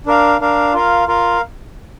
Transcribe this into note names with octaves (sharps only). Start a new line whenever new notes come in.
D4 A#4 F5
D4 A#4 F5
F4 A#4 F5
F4 A#4 F5